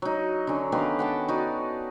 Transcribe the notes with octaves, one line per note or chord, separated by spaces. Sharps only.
F#3 D#4
D3 C#4
D#3 B3 G4 F5
F#5 G5 A5
D#4 F#4 D5